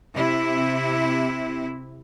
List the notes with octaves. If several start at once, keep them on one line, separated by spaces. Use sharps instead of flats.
C3 C4 E4